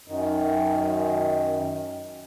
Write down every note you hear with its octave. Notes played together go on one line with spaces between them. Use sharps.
F#2 D#3